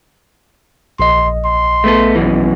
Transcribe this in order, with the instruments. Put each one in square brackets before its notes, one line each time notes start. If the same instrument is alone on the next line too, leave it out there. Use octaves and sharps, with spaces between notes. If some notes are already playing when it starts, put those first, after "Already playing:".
[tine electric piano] A#1 D#5 [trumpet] C6
[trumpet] C6
[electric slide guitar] A3 B3 A4
F#2 B2 E3